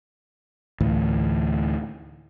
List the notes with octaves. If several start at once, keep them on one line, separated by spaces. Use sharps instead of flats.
D2 A2 E3